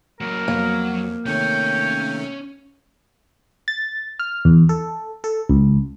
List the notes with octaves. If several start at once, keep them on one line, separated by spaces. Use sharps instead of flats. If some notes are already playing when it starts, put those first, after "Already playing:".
F#3 A#3 A#4
F2 F#3 A#3
C3 D#3 A3 C#4 C#5 G5
A6
F6
E2
A4
A4
C#2